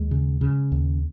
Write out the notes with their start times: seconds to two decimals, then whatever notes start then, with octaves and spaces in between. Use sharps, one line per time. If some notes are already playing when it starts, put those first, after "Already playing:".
Already playing: D#2 G#3
0.11 C#3
0.41 C#3
0.72 D#2